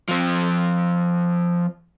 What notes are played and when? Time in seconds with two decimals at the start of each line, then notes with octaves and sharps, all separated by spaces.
0.09 F3 C4